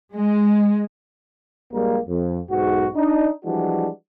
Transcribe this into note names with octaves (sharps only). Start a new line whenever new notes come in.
G#3
A#1 G3 G#3 A#3
F2
B1 G#2 F#4
D4 D#4
E3 F3 G3 G#3 D4 F#4